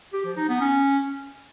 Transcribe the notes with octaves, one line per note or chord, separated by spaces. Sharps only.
G4
F3
D#4
B3
C#4